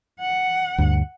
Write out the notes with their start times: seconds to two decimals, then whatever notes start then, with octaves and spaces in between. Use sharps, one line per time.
0.21 F#5
0.78 D2 G2